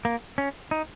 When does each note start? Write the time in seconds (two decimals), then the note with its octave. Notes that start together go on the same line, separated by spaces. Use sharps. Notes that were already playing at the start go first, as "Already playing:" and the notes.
0.05 A#3
0.38 C#4
0.71 D#4